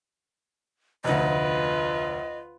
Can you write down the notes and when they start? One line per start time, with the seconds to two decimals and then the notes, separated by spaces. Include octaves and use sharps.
1.04 F1 D2 F4 B4 D#5